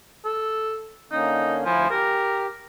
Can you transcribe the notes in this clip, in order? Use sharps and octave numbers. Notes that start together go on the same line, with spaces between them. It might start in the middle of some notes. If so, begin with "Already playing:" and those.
A4
D3 A#3 C#4 D#4
D2 F3 E4 G#5
G4 A#4